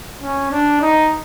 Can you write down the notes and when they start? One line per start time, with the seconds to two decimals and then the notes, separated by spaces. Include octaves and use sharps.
0.22 C#4
0.51 D4
0.81 D#4